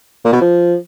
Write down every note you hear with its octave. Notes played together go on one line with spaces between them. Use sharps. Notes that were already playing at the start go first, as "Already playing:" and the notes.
A#2
B2
F3